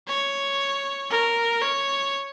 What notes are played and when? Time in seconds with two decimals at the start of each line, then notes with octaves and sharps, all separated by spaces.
0.08 C#5
1.10 A#4
1.61 C#5